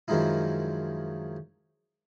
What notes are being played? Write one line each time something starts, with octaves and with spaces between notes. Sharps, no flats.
F#2 D#3 F3 G#3 D#4 E4